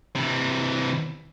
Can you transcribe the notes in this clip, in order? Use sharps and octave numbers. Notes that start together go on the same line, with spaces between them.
C3 E3